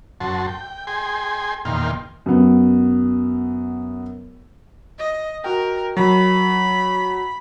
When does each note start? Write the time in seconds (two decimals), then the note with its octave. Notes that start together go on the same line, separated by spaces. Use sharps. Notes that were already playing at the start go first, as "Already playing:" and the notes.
0.20 F#2 F#4 A5 C6
0.47 G5
0.87 G#4 G5 G#5 C6
1.65 E2 A#2 D#3 G5 C6 F6
2.26 F#2 B3
4.99 D#5
5.44 F#4 A#4 G5
5.97 F#3 B5